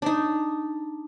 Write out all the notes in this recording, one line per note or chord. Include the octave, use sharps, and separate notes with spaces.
D4 D#4